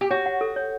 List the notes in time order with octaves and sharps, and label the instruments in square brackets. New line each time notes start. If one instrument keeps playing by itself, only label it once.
[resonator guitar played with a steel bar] G4
[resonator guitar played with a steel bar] F#4 [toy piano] C#5
[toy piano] F#5
A4
C#5